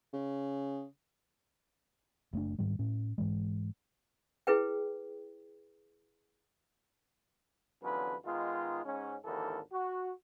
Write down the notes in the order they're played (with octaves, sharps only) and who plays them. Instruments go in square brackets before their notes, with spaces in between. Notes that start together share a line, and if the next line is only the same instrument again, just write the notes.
[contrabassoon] C#3
[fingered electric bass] F#1 A3 D4
G#2 D#3 G3
A2 C#4
G#2 E3 G#3
[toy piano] E4 G#4 B4 G5
[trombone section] E2 D3 F3 F#3 C#4 B4
D#3 G#3 B3 D#4 F4
G#2 C#4
G#1 D#2 D3 E3 A4 A#4
F#4